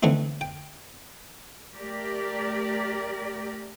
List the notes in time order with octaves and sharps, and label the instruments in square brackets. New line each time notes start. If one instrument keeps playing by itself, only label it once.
[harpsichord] D3 E3 A3 C4 D#4
G5
[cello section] A3 G4 A#4 D5